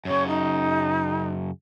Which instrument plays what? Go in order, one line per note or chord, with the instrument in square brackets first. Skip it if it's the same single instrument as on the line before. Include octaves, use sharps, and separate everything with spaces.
[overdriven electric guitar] F#2 C#3 [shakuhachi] C#5
[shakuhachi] D#4